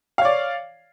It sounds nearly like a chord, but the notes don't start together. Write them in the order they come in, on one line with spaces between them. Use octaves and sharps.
F5 C#5 D5